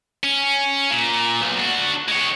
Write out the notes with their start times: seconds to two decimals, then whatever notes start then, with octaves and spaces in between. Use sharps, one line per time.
0.23 C#4
0.91 A#2
1.41 B1
1.59 D4 F#4
2.08 G#3 C#5